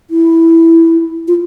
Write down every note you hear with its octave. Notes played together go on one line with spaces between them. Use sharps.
E4
F4